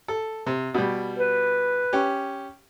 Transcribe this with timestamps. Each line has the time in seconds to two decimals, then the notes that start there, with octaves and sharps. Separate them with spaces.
0.08 A4
0.46 C3
0.74 B2 G3
1.19 B4
1.93 C#4 G4